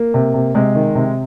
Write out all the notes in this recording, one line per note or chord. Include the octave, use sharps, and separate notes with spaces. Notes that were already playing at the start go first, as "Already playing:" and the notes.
Already playing: A#3
C3
C3
C3 G#3
D#3
C3